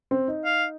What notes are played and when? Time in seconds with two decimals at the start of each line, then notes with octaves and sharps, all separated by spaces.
0.11 C4
0.28 D#4
0.45 F5